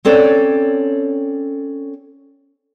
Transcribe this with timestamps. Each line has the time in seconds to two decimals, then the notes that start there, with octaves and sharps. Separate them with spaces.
0.05 C4 C#4 A4 C#5 D5